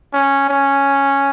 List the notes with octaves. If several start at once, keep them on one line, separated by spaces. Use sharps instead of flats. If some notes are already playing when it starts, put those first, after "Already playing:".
C#4
C#4